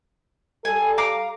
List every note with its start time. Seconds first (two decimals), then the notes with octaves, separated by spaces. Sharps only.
0.65 G3 A4 G#5
0.98 F5 A#5 D6